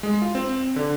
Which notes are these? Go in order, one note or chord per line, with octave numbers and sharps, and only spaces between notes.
G#3
F4
C4
D3